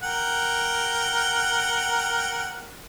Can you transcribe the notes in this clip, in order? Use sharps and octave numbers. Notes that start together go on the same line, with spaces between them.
A#4 F#5 G5